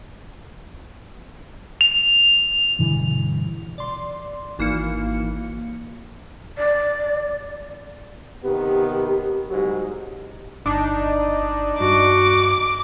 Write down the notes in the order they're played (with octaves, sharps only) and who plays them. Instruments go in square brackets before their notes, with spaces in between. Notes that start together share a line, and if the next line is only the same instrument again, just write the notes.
[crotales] F7
[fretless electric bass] G2 B2 D3 E3
[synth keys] D5 C6
G#1 E3 A#3 F5 C#7
[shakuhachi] D5
[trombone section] C3 D#3 B3 [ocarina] G4
[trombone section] C2 G#2 F#3
[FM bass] G1 [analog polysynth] D4 D#4
[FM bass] G2 [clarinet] F#4 [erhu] D6